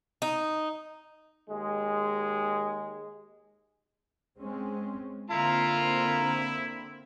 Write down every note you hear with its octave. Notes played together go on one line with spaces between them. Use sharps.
D#4
D#2 G#3
G#3 C4 C#4
D3 A#3 C4 E4 F4 F5 A#5